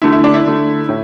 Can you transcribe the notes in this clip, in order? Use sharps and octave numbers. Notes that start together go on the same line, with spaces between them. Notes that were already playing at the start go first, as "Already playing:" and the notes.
D3 A3 E4
E4
D4
E4
D3 A3
A2